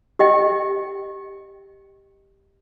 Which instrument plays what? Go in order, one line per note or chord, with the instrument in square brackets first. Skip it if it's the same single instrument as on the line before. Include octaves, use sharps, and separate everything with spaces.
[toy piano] G4 D#5 G5